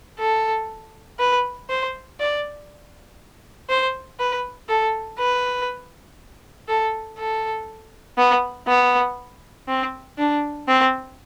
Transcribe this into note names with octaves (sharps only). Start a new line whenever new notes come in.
A4
B4
C5
D5
C5
B4
A4
B4
A4
A4
B3
B3
C4
D4
C4